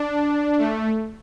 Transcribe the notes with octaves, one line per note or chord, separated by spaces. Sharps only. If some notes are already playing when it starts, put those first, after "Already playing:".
Already playing: D4
A3